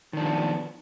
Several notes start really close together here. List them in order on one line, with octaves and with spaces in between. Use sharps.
D#3 D4 F3 B3